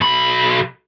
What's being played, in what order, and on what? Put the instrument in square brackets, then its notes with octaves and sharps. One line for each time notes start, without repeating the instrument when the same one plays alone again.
[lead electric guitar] B1 B5